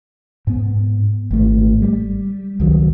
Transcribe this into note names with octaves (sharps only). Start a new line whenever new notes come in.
G#2 B3
G#1 A3
G3
C#2 D#3 F#3